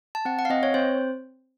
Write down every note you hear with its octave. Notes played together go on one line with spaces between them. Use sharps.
A5
C4 F#5
F#5
F5
C4 D#5
C#5
C4 C5